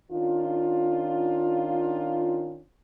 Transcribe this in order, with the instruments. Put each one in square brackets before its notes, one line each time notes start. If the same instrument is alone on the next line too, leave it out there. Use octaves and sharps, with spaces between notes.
[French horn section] D#3 C#4 D4 F4